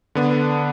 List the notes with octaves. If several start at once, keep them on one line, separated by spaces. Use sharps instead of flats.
D3 B3 D4